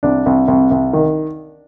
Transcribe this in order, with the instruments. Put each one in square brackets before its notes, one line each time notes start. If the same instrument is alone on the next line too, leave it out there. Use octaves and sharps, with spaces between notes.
[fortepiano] C2 D4
C2
C2
C2
D#3